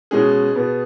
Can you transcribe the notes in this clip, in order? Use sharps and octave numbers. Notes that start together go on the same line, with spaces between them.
B2 G#3 C#4 G#4
B2 B3